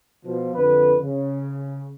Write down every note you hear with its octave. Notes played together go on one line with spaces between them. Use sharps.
B2 F3
F2 D3 B4
C#3